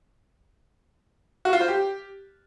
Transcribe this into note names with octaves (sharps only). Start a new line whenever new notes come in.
F#4
F4
C5
G4